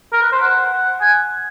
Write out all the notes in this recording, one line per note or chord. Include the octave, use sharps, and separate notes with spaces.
A#4
B4
C5
F#5
G#5